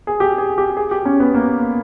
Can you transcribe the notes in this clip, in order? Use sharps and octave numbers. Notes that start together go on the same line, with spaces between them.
G#4
G4
G#4
G4
G#4
G4
C#4
B3
A#3